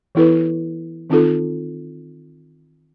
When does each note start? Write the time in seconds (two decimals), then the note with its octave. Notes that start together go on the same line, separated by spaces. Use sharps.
0.15 E3 B3 E4 A4 B4
1.10 D#3 C4 D#4 F4 A4